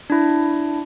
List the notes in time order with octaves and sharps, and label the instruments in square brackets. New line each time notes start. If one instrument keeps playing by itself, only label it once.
[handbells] D4 E4